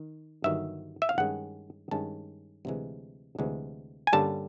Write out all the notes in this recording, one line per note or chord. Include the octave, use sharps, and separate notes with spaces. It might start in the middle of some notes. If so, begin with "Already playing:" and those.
Already playing: D#3
G1 G2 D#3 F#3 E5
E5
F5
G2 D#3 G#3 C#4 F#5
G2 D#3 G#3 C#4 A5
D2 C3 E3 G#3
D2 C3 E3 G#3
G#5
G2 D3 G3 A#3 C#4 A5